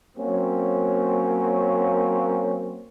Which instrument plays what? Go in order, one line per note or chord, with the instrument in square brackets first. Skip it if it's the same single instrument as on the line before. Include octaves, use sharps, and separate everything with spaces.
[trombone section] F#3 A#3 C4 C#4